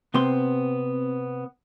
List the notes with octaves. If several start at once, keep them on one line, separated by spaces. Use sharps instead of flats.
C3 B3 C4 C6